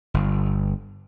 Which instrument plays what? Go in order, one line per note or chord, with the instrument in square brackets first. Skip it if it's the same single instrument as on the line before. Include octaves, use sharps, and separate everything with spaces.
[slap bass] G1